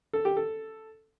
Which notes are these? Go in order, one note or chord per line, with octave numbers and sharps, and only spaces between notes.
A4
G4
A4